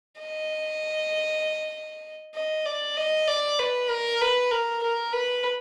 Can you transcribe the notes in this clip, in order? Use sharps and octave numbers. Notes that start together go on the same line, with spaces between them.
D#5
D#5
D5
D#5
D5
B4
A#4
B4
A#4
A#4
B4